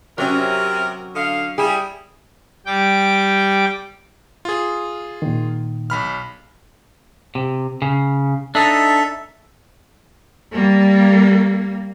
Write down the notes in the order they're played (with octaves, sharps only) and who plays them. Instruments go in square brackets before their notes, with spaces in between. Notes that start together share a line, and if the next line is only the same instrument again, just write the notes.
[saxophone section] C3 A#4 [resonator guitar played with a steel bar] F#3 C#4
[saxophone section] D3 D#5 F5
[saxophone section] G3 E4 [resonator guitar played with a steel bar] G#4
[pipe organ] G3 G5 D6
[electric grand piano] F4 G#4
[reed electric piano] A#2 D#3
[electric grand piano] B1 B5 F6
[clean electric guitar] C3
C#3
[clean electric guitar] D4 D#4 [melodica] A4 E5
[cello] G3 A#3